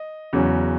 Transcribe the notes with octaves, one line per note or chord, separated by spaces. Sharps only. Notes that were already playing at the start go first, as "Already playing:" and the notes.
Already playing: D#5
E2 C#3 F#3 C#4